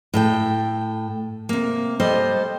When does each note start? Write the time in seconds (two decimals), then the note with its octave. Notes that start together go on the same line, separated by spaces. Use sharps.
0.14 A2 A4 G5
1.49 C3 A#3
2.00 G3 A4 C5 D#5